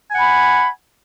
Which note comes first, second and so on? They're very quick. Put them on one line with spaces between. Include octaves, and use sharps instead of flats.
G#5 F#5 B5